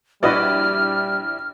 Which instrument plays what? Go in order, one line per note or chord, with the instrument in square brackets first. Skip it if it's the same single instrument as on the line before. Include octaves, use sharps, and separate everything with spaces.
[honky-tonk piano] A#1 E4 D5 [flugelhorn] G3 [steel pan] F#4 B4 D#5 [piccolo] F6